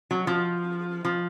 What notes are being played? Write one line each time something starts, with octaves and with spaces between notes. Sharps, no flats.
F#3
F3
F3